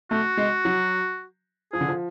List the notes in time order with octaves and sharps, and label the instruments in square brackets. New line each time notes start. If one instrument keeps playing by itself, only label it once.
[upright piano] A3 [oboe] F#4
[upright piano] G#3
F#3
[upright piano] F3 [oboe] G#4
[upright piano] D3
F3